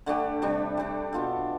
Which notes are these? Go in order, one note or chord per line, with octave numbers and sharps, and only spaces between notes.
D3 A3 D4 G4
C3 G3 D4
G3 D4 A4
B2 B3 F4 A4